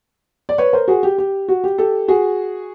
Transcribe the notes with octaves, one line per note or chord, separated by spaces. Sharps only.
D5
B4 C#5
A#4 C5
F#4 G#4
G4
G4
F#4
G4
G4 A4
F#4 G#4